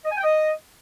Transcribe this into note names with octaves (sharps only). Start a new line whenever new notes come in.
D#5
G#5
G5
D#5